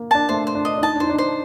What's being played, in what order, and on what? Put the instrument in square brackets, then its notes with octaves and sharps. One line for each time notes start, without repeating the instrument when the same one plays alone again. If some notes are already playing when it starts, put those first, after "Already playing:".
Already playing: [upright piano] A#3
[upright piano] D4 [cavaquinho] A5
[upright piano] A3 [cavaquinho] C5
[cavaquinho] C5
[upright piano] D4
[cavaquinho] D#5
[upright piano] D4
[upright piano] D#4 [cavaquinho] A5
[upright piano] D4
[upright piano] D#4 [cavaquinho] C5
[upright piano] D4
[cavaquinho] C5